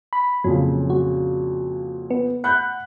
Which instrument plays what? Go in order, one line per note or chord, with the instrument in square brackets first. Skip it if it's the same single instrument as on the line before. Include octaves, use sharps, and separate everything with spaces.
[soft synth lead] B5
[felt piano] F2 A#2 C#3 [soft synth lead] F#3
[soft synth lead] F#4
B3
[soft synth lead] F#5 [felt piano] B5 F#6 G6